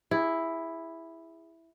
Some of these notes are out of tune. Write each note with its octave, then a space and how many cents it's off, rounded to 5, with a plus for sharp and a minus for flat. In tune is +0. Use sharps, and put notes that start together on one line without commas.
E4 +0 G#4 -30